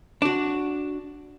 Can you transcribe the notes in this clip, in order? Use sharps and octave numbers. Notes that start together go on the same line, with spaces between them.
D4 F#4